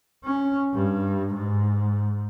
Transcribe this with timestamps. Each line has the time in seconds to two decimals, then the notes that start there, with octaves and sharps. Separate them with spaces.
0.24 C#4
0.74 G2
1.34 G#2